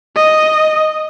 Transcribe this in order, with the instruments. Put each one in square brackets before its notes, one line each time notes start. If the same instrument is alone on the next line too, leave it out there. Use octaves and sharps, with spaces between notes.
[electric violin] D#5